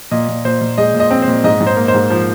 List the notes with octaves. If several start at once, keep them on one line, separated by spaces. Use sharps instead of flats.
A#2 D#5
A#2
A#2 C5
A#2
G#3 D#5
A#2
D#5
C4
C5
A#2
G#2 D#5
G#2
C5
A#3
C5
G#2
F3